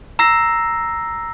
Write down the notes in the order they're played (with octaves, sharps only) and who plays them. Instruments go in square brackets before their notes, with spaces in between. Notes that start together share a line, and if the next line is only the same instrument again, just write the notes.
[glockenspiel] A#5 E6 A#6 C7